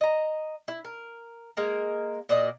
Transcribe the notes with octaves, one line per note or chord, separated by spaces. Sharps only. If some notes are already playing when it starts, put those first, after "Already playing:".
D#5 A#5
E4
A#4
G#3 A#3 A#4
A#2 F#4 D5 D#5